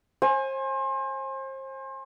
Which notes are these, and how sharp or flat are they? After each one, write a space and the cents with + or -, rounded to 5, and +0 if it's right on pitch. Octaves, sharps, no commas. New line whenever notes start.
C5 +35 G#5 +0